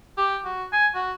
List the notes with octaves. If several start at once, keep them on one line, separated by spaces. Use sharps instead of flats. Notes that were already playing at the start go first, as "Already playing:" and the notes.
G4
F#4
G#5
F#4